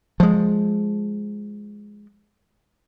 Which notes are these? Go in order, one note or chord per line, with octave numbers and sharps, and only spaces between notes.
F3 G#3